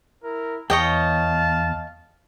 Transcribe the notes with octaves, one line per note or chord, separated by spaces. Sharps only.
E4 A#4
E2 C#5 D#5 F5 G5 A5